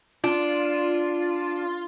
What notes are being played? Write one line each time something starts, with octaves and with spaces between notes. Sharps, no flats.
D4 F4